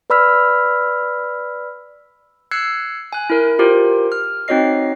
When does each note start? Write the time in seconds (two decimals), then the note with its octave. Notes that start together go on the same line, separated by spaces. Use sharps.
0.10 B4 D5 B5 E6 F6 B6
2.51 E6 F#6 G#6 C7 C#7
3.13 G#5 F#6
3.30 E4 A#4
3.59 F4 G4 A#4 C5
4.12 F6
4.48 C4 D#4 F#4 C#5 D#5 C7